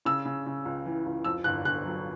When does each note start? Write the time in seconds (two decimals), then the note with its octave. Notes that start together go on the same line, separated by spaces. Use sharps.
0.05 C#3 E6
0.25 C#3
0.46 C#3
0.65 C#2
0.86 E3
1.06 C#2
1.24 F2 E6
1.44 G1 F#6
1.65 G1 F#6
1.85 F#3